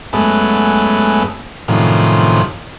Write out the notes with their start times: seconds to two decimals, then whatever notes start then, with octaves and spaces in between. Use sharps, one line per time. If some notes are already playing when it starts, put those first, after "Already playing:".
0.13 F#2 G#3 A3 B3
1.68 F#2 A2 C3 D#3 F3